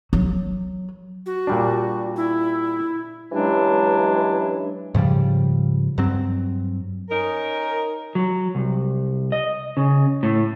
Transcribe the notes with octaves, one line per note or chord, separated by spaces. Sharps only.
F#3
F#4
A#2 G3 D4
E4
G2 E3 F#3 G#3 C#4 D4
G#2 C#3 F3 G3
G2 F#3 C4
C#4 D#4 A#4
F#3
C2
D#5
C#3
A2